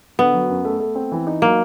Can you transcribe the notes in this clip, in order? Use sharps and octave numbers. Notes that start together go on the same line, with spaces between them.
D3 B3
F#3
F#2
A3
A3
C4
E3
D#4
F#3 A#3